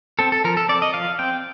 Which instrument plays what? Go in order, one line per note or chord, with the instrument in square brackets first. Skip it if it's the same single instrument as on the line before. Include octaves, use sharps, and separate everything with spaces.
[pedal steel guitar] C4 A4
A4
F3 A#4
A4
C4 D5
D#5
F3 F5
C4 G5